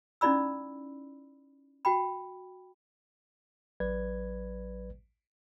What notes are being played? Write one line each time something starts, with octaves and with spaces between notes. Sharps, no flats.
C#4 D#4 E4 D5 B5 E6
F#4 G5 B5
A1 F#3 B4 D5 G#6